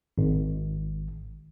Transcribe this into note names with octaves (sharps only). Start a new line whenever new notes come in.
G#1